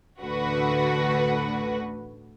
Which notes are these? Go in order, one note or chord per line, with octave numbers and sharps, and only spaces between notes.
A1 D2 D3 F#4 B4